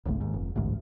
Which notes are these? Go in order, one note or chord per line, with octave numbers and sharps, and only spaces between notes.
D1 G#1 C#2 A3
D#2 G#2
F1
A1 D2 G#2